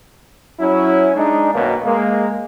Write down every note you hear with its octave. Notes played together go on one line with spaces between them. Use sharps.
F#3 C#4 E4
G#3 D4 D#4
F#2 B2 D#3 F#3 A#3
G#3 A#3